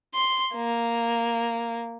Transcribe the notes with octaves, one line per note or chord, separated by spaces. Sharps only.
C6
A#3